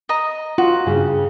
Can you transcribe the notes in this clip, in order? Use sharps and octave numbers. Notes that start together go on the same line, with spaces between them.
D#5 A#5
F4 F#4
G2 C#3